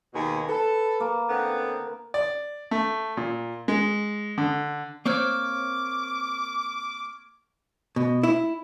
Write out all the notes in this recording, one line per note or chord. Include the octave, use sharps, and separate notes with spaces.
D#2 B2 G#4
A4 B4
A#3
D3 B3 C4
D5
A3
A#2
G#3
D3
A#3 C4 C#5 C#6 D6 F6 G#6
B2
E4